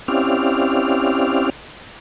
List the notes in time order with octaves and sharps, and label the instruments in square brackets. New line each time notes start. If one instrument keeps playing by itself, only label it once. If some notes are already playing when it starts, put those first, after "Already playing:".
[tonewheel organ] C4 C#4 E4 G4 D5 F5